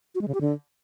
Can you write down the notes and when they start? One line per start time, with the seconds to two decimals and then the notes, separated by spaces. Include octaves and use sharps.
0.15 F#4
0.21 G#3
0.28 C#3
0.34 G4
0.41 D3